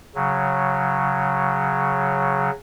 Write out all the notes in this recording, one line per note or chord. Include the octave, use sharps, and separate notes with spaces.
C#3 F#3